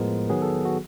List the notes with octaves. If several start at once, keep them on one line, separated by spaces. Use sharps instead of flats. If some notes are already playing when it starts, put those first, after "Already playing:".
Already playing: A2 F3 G#3 B3 A#4
D#3 F#3 B3 G#4
A4
F#4